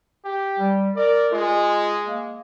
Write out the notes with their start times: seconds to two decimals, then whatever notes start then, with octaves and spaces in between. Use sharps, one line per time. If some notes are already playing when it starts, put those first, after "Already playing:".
0.25 G4
0.59 G3
0.96 A#4 D5
1.32 G#3 F4
2.07 A#3